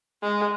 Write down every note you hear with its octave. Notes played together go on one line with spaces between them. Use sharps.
G#3